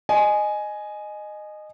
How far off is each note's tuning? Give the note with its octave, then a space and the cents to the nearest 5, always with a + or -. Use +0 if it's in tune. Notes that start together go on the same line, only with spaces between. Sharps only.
D#5 -20 G#5 +10